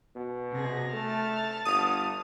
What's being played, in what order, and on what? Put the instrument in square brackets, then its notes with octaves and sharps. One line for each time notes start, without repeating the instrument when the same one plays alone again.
[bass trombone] B2
[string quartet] C3 G#4 A#6
[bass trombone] A3 [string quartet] A5 F6
[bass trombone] G1 [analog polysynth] D#6